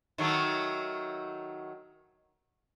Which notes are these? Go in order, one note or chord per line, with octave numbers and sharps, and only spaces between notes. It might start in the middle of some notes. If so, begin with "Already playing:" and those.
D#3 F#3 A3